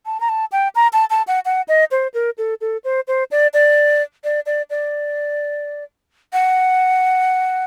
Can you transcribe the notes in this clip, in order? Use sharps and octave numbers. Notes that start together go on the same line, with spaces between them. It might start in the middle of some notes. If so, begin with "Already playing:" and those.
A5
A#5
A5
G5
A#5
A5
A5
F#5
F#5
D#5
C5
A#4
A4
A4
C5
C5
D5
D5
D5
D5
D5
F#5